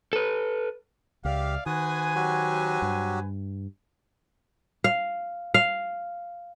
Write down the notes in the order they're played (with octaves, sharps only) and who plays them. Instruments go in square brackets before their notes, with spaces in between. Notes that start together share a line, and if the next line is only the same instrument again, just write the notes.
[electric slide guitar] A4 B4
[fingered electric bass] C#2 [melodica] G4 [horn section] D5 E5 F5
[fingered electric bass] D#3 [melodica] F#4 D#6 [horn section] B4 C5 G#5
[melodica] F#3 F#4 G4
[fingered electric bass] G2
[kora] F5
F5